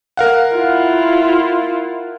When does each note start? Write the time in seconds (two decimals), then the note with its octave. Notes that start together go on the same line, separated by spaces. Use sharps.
0.17 A#4 F5 F#5
0.55 E4 F4